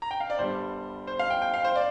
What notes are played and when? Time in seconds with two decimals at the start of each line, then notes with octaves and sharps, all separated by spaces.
0.02 A#5
0.11 G5
0.20 F5
0.30 D5
0.39 G1 G2 G3 C5
1.07 C5
1.19 F5
1.30 G5
1.42 G5
1.54 F5
1.64 C5
1.76 D5